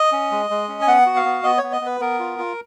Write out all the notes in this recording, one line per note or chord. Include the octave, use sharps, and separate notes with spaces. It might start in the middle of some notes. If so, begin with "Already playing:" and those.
Already playing: D#5
C#4
G#3
G#3
C#4
G#5
B3 F#5
F#4
F5
B3
B3 D#5
C#5
B3
D#5
B3 B4
B3 A#4
F4
F4